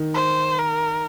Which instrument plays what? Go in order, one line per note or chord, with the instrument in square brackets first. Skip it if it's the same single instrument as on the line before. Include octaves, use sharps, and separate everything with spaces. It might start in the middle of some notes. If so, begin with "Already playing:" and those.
Already playing: [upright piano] D#3
[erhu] C5
A#4